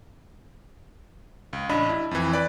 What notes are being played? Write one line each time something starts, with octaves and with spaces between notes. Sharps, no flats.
C#2
A1 D4 D#5 B5
E4
F2 E3
B4 D5